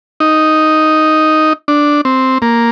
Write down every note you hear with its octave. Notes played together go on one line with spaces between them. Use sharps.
D#4
D4
C4
A#3